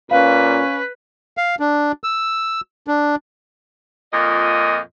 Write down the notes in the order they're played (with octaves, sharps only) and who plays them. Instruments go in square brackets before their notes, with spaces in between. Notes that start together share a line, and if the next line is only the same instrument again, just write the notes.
[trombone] A#2 [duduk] C#4 [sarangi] B4 [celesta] F5
[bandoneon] F5
D4
E6
D4
[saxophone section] F2 A#2 D#5